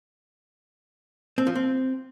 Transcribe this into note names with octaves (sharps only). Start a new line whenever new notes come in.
C4
F3
C4